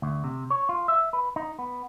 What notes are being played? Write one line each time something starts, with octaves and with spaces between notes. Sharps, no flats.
D2
C3
C#5
F4
E5
B4
D#4
B3